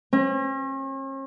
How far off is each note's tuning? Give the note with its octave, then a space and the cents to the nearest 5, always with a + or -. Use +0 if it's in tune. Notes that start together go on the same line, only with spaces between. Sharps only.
C#4 -45